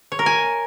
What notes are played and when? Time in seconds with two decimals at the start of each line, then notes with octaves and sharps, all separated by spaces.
0.12 C#5
0.19 A#4
0.26 G#5